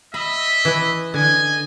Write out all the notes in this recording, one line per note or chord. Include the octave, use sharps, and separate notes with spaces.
D#5 E5 B5
E3 E4 B4
D3 D#5 G#5